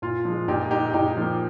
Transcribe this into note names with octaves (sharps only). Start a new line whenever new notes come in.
A#2 F4
F3 G#3
A#2 D#4 G4
G#3 D#4 G4
A#2 D#4 G4
F3 A#3